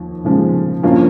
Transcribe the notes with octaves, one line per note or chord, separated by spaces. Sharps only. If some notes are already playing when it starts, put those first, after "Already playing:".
Already playing: D#2 F3
D#2 C#3 F3 G#3
G2 F3 A#3 C#4 F4